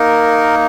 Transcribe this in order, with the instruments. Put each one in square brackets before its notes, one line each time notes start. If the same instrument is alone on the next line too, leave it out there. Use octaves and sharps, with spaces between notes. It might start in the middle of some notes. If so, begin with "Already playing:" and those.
Already playing: [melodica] A#3 D#4 A#4